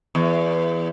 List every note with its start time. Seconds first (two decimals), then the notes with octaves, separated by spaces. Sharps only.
0.15 E2